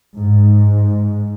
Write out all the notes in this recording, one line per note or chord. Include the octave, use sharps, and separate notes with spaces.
G#2